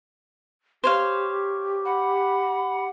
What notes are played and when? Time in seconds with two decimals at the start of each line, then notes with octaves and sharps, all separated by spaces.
0.84 G4 C5 C#5 F5
1.85 F#5 B5